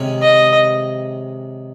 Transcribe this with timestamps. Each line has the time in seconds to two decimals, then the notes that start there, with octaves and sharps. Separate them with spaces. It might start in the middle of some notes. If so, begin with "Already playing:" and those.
Already playing: C3 D#3 G#3 C#4
0.22 D#5